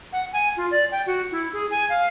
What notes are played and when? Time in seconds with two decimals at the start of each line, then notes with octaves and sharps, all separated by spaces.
0.13 F#5
0.33 G#5
0.57 F4
0.71 D5
0.92 G5
1.07 F#4
1.32 E4
1.53 G#4
1.71 G#5
1.90 F5